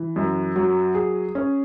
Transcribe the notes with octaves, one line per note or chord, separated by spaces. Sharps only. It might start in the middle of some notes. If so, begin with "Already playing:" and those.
Already playing: E3
F#2
F#3
G#4
C#4